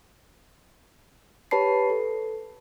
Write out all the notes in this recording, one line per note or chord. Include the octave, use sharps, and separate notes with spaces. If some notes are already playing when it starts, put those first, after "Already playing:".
G4 B4 C#5 A5 B5 C7
A4